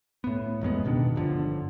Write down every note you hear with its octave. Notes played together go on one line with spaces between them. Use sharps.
A2 B3
A1 F2 G#3 B3
D1 B2 D#3 D4
G1 D3 F3